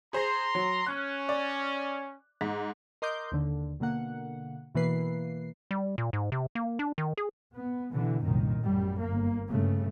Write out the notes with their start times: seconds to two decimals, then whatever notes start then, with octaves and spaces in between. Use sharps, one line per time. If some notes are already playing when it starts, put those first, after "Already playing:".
0.13 G#4 C5 A#5 C6
0.55 F#3
0.86 C#4 F#6
1.29 D5
2.41 G#2
3.02 A#4 D#5 C6 D6 D#6 G6
3.32 D#2 D3
3.80 B2 D3 A#3 F#5
4.75 B2 E3 A#3 B4 C7
5.71 G3
5.98 A#2
6.13 G#2
6.32 C3
6.55 A#3
6.79 D4
6.98 D#3
7.17 G#4
7.55 B3
7.93 B2 D3 E3
8.23 C2 F#2 A#2 D#3
8.60 A1 F#2 G3
9.01 G1 A#3
9.50 G2 C#3 A3